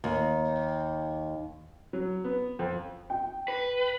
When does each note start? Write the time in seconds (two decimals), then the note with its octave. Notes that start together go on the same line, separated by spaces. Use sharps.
0.04 D#2
1.93 F#3
2.24 B3
2.59 F2
3.10 G5
3.48 B4